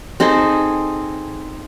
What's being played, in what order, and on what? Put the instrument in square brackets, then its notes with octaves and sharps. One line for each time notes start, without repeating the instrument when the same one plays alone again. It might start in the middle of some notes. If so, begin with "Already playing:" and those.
[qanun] C4 D#4 G#4 A4